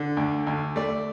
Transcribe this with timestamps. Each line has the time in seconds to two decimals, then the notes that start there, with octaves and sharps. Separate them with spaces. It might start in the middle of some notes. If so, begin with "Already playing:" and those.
Already playing: D3
0.17 D2
0.47 D2
0.76 A3 D5